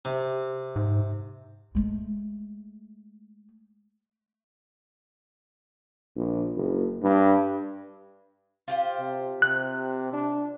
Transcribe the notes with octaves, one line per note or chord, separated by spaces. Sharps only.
C3
G#2
G#3 A3
A#1
F#1
G2
F4 G4 C5
C3
C3 F#6
D4